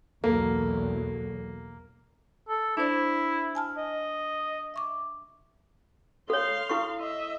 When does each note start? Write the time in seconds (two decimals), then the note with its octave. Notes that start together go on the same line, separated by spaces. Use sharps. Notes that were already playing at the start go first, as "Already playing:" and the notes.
0.24 B1 E2 F#3 A#3 A4
2.49 A4
2.77 D4 E4 C5 D5
3.55 G#5 A5 F6
3.77 D#5
4.74 E5 C#6 D6
6.30 A4 C#5 F5 C6
6.69 E4 A4 C#6
7.00 D#5 E5